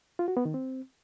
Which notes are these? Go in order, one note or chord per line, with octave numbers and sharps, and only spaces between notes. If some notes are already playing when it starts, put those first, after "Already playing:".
F4
F#4
B3
D#3
C4